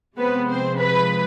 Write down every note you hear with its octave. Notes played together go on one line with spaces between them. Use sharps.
C3 F3 G#3 B3 C4 B4
C4 C5
B4 B5